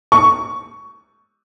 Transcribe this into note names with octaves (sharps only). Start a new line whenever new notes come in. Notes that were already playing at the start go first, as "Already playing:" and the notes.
C#6